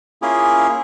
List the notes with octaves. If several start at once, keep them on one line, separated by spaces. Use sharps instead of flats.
A#3 C#4 E4 F4 G#4